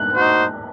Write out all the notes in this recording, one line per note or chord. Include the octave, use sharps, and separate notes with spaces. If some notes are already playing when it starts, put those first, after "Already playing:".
Already playing: F#6
D#4 F#4 C5